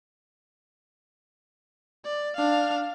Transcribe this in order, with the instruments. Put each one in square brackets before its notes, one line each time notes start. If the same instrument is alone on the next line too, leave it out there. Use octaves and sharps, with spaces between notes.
[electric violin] D5
D4 F5